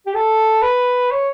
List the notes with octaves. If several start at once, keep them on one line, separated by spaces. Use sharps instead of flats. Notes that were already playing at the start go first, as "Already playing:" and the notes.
G4
A4
B4
C#5